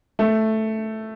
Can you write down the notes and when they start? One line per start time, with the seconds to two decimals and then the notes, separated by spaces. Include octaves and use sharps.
0.19 A3